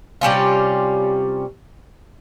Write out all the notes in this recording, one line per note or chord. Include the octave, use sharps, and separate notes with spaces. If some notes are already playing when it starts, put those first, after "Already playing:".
C3 G3 C#4 F4